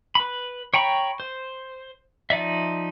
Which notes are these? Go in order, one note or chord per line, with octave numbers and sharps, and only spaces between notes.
B4 B5
C#5 G5 A#5 B5 C#6
C5
F3 D#4 D5 E5